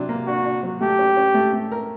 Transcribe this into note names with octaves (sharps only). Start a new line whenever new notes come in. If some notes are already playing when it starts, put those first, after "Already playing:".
Already playing: C3 F#3 D4
A#3
D4 F#4
D4
F#3
A3 G4
C#4
C#4
A3
A3
A#4